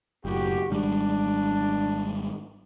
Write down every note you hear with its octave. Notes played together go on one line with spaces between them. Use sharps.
F#1 A2 F#4 G4
G#1 G3 G#3 D4